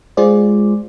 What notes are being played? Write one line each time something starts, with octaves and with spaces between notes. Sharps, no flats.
G#3 F4 G#4 C5 D5